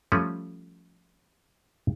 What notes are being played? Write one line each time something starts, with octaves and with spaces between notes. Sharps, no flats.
F3 G3 A3 C#4